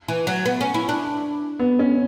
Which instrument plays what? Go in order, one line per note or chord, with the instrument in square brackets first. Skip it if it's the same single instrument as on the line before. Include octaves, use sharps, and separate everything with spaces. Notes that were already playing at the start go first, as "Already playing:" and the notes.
[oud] E3
F#3
B3
C#4
E4
D4
[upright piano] B3
C#4